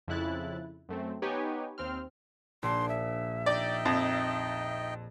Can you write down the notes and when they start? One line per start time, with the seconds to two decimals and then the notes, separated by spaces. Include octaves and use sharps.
0.08 F2 C#3 E4 F#6 A6
0.89 F#2 A3 C4
1.22 B3 D#4 G4 B4 C#5 G#5
1.78 D#2 C4 C6 F6
2.63 A#1 C6
2.89 E5
3.46 D#4 D5 D#5 G5
3.85 F2